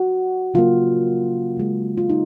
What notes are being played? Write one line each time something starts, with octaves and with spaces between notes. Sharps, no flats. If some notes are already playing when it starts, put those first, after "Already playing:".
Already playing: F#4
C#3 F#3 A#3 F4
C#3 G#3
F4
D#4